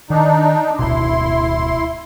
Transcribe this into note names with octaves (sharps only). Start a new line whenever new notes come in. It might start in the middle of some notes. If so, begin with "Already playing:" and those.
D#3 D4 D#4
D1 G#1 B2 E4 C6